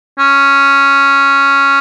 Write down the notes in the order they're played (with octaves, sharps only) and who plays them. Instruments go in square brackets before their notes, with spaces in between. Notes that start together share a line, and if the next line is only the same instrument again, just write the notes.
[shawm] C#4